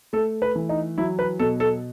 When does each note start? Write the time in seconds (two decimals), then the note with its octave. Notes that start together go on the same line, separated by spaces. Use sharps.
0.13 A3 A4
0.42 B4
0.56 E3
0.69 D#4
0.98 F#3 E4
1.19 B4
1.39 B2 A4
1.60 A4